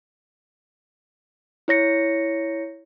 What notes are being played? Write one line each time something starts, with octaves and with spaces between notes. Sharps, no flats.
E4 C#5 A#6 C#7